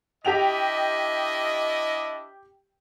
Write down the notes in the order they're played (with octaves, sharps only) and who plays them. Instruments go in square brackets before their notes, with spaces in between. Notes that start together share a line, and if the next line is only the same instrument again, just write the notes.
[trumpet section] D4 E4 D#5 [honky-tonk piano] G4 G5 F7